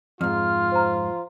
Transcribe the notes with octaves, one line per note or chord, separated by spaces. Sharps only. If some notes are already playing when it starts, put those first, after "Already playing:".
F2 G#2 F4 F6
C5 A#5